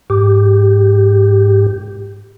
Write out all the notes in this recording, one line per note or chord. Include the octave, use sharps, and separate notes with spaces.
G#2 G4